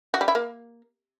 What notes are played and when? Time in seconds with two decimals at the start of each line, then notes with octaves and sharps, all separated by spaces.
0.14 F#4
0.21 G3
0.28 E4
0.35 A#3